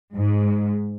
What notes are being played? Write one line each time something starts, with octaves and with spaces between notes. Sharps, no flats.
G#2